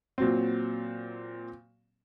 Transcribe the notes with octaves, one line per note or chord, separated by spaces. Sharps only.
A#2 F#3 C4